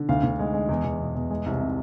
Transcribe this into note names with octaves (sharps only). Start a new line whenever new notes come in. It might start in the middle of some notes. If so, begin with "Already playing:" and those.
Already playing: D3
D2 F5
D2
G#3
G#3
E2
E2
B2
E2
G#3
C2
C3